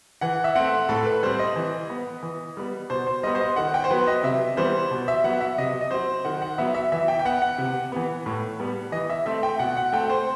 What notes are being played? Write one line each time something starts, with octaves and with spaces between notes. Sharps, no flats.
E3 F#5
E5
A3 C4 F#5
A2 A4
B4
G3 C4 C5
D#5
E3
B3
E3
G3 B3
B2 C5
C5
G3 B3 D#5
C5
D#5
D#3 F#5
G5
C5
F#3 B3 B4
D#5
C3 E5
E3 G3 B3 C5
B2
E5
F#3 B3 F#5
E5
C3 D#5
D#5
F#3 C4 C5
D#3 F#5
F#5
F#3 B3 E5
E5
E3 E5
G5
G5
B3 F#5
F#5
C3
E3 B3
A2
G3 B3
E3 D#5
E5
A3 C4 E5
G5
B2 F#5
F#5
A3 C4 G5
C5